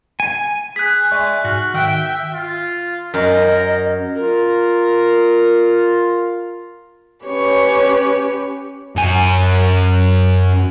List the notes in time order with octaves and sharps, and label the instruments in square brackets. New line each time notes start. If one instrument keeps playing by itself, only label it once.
[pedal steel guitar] G#5
[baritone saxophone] G#4 [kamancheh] G#5 [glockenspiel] F#6 B6
[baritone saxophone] G#3 [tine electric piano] D5 E5 C#6
[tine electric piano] G#2 F6 [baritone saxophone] F#4
[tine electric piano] D#3 [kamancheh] E5 G5
[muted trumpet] F4
[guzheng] F#2 [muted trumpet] A#4 [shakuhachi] D#5
[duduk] F4 [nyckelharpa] A#4
[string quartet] C#4 G4 B4 C#5
[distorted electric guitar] F#2 G#5